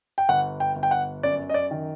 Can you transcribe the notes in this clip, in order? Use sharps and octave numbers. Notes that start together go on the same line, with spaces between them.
G5
G1 F#5
G5
G1
G5
F#5
F#2 D5
D#5
D5
D#3